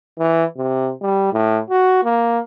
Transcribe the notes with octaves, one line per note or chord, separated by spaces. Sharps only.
E3
C3
G3
A2
F#4
A#3